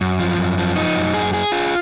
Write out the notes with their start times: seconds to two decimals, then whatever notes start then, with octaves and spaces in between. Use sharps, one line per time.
0.01 F#2
0.19 F3
0.38 F#2
0.58 F3
0.76 D#4
0.96 F#2
1.14 G#4
1.33 G#4
1.52 F4